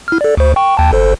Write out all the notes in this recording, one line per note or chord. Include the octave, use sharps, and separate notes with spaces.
E4 F6
A4 D5
D2 C5
G5 C#6
D#2 G5 A5
G1 A4 C5